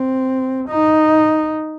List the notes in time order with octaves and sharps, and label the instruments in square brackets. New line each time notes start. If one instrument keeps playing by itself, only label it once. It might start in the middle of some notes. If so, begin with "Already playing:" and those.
Already playing: [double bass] C4
D#4